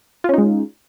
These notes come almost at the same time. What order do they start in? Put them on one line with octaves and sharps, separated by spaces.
F4 C#4 D#4 G#3